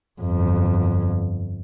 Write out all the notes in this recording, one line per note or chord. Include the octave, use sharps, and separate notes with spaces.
G1 F2